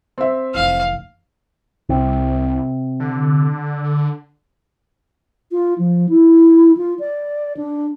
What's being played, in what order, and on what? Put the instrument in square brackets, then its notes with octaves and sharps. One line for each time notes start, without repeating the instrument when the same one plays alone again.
[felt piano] C4 E5
[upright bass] F1 E3 [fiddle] F5
[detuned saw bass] C2 [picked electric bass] C3
[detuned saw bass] D3
[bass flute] F4
F3
E4
F4
D5
D4